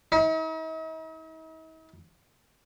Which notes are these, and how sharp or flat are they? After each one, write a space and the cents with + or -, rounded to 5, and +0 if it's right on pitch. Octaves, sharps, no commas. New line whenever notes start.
D#4 +45